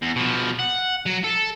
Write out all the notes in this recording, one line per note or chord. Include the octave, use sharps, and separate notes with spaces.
E2
B2 F3
F#5
F#3
A4